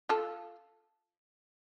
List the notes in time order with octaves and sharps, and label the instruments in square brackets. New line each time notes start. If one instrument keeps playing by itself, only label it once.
[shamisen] F4 A4